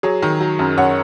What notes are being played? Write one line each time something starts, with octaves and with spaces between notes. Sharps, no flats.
F#3 G#4 C#5
D#3
F#3
F#2
F#2 C#5 F#5